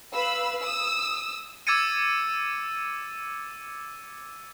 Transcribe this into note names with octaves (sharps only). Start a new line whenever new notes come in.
B4 F5 B5 E6
D#6 E6
D6 E6 G#6 A6 C#7 D#7